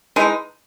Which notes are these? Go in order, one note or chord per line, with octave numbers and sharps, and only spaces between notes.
E3 G#3 D#4